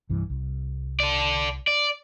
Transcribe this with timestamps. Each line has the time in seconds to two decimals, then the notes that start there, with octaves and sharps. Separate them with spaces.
0.09 C2 G2 E3
0.30 C2
1.00 A4 D5
1.67 D5